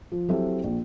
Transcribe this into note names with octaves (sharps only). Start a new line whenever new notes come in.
F3
F#3 C4 E4 G4 A4 E5
A#1